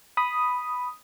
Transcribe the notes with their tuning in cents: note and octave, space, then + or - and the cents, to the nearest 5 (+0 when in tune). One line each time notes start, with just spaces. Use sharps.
B5 +0 D#6 +0